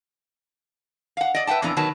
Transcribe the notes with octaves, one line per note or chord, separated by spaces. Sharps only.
F5 F#5
D5 D#5
B4 E5 F#5 G5 A5
F2 A#2 E3 B3 D4 A#5
B2 D#3 F#3 B4 A5